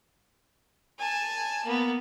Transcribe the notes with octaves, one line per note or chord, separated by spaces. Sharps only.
G#5 A5
A#3 B3